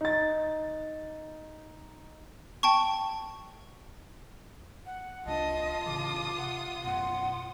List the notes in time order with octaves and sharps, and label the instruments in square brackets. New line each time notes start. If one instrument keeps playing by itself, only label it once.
[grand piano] D#4 A6
[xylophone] G5 A5 C#6
[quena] F#5
[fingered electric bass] C2 F#3 D4 [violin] F4 D#6 [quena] D#5 [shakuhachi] A5
[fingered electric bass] A2 C#3 E3 [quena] D6
[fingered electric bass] C3 [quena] F#5
[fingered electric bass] F#2 B2 [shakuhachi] F#5 [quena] C6